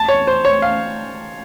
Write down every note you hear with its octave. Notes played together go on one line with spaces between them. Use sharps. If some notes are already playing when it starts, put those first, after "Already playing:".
Already playing: A5
C#5
C5
C#5
F5